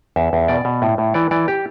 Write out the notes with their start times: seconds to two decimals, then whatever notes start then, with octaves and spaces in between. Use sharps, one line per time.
0.16 E2 E5
0.33 E2
0.48 B2 D5
0.65 B2
0.82 A2
0.98 A2
1.14 E3 D5
1.31 E3 D5
1.48 G4